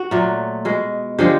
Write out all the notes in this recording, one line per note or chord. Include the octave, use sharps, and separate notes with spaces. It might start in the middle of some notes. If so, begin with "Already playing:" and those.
Already playing: F#4
A#2 F#3 A3
B2 G#3
D3 F3 G#3 G4